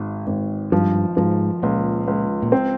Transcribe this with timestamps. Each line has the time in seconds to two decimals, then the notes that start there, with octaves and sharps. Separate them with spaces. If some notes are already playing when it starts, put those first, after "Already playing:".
Already playing: G#1 G#2
0.27 G#1
0.72 G2 F3
1.17 G#2 F3
1.63 C#2 A#2
2.08 C#2
2.42 A#2
2.52 C4